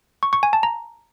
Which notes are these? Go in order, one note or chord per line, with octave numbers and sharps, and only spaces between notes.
C#6
C#6
G#5
A5
A#5